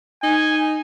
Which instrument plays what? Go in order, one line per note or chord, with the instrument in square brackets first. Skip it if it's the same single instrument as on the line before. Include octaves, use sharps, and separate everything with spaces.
[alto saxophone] D#4 [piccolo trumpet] G#5